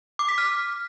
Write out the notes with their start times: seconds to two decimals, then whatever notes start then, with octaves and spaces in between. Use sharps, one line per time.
0.19 D6
0.28 B6
0.38 F6